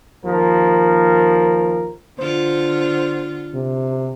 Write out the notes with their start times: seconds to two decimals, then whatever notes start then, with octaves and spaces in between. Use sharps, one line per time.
0.24 D#2 F3 A#4
2.19 D3 F4 C5
3.54 C3